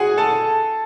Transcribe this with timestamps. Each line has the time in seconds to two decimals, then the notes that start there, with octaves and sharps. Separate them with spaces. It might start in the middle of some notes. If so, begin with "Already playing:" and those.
Already playing: F#4 G#4 F#5 G#5
0.17 A4 A5